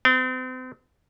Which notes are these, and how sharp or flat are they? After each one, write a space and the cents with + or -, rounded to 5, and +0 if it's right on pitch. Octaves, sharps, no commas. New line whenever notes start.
C4 -40